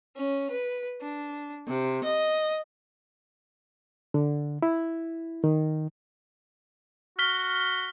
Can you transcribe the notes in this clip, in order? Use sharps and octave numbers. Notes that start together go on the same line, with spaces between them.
C#4
B4
D4
C3
D#5
D3
E4
D#3
F#4 F6 B6 G7